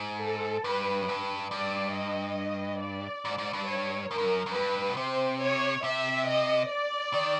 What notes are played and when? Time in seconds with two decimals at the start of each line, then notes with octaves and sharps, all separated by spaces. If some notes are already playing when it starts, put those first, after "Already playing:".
Already playing: G#2
0.22 A4
0.64 G2 B4
1.02 F#2
1.09 G2
1.51 G2 D5
1.94 D#5
2.81 D5
3.25 G#2
3.38 G#2
3.53 G2
3.67 C#5
4.11 F#2 A#4
4.18 G2
4.25 F#2
4.46 F#2
4.54 G2 B4
4.90 B2
4.97 C3 C5
5.40 C#5
5.84 C3 E5
6.27 D#5
6.70 D5
7.14 D#3